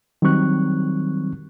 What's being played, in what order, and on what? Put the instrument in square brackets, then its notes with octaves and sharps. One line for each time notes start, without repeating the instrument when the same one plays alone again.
[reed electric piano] D#3 F#3 G3 C4 C#6 F#6